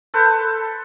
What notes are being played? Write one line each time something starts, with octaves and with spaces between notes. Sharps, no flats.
A4 B4 C5